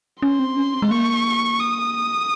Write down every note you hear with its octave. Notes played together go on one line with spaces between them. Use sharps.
C#4 C6
C4
C#4
C4
G#3
A#3 C#6
D#6